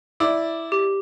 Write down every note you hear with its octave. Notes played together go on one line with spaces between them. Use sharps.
E4 D5
G4